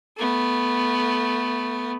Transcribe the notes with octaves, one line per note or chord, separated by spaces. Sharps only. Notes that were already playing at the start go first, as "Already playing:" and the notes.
A3 B3